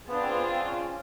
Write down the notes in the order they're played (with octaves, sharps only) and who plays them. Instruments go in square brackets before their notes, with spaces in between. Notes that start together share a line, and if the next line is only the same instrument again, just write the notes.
[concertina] B3 [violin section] D4 F4 G#4 C5
[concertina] C4
B3
C4
C#4
C#4